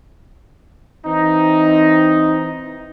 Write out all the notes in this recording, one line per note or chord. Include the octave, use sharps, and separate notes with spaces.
E3 C4 D#4